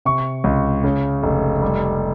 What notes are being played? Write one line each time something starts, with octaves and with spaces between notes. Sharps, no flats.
C3 C#6
C#2
C#3
F1
G3